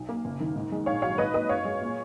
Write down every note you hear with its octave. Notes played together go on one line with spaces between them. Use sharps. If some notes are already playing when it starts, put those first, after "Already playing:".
Already playing: B1
A#3
F#1
D#3
G#2
G#3
A#1 C#5 F5
F#3 C#5 F5
G#2 B4 D#5
A#3 B4 D#5
F#2 C#5 F5
G#3
A#2